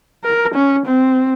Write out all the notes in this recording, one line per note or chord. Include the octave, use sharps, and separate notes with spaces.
A#4
C#4
C4